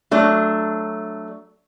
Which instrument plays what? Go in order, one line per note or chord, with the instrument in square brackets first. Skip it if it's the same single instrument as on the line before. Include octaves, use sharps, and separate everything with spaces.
[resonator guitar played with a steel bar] F#3 A3 D4